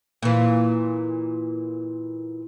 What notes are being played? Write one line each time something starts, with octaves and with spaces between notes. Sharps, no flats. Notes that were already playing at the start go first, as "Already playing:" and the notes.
A#2 E3